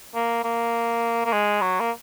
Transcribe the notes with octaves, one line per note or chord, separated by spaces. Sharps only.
A#3
A#3
A#3
G#3
F#3
A#3